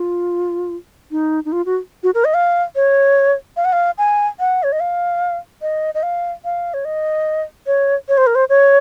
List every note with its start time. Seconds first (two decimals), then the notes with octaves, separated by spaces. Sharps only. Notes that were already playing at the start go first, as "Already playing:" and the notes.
Already playing: F4
1.11 D#4
1.45 D#4
1.52 F4
1.66 F#4
2.03 F#4
2.14 A#4
2.25 D#5
2.34 F5
2.76 C#5
3.57 F5
3.65 F#5
3.73 F5
3.98 G#5
4.40 F#5
4.63 C#5
4.72 D#5
4.80 F5
5.62 D#5
5.95 D#5
6.03 F5
6.45 F5
6.74 C#5
6.85 D#5
7.67 C#5
8.09 C#5
8.18 C5
8.27 A#4
8.35 C5
8.49 C#5